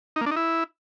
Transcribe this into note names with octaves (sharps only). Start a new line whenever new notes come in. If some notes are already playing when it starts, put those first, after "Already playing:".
D#4
A#3
D4
D#4
E4